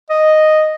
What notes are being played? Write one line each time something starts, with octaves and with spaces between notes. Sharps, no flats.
D#5